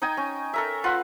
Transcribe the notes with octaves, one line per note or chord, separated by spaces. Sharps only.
D#4 D#5 G5 G#5
C#4
A4 A#4 E5
F4 B4 F#5 C6